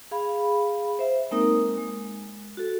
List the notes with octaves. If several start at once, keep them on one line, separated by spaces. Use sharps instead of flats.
G#4 F5 B5
C5 E5
G#3 A#3 C4 D#4 A#4 D#6
G#3
F#4 A4